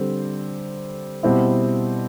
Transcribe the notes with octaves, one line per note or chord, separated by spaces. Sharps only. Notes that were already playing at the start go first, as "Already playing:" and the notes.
Already playing: D3 G3 C4
B2 G3 C4 E4